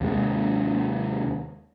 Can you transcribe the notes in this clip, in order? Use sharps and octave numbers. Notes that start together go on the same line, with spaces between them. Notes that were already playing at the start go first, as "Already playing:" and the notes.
D#2 C3 G#3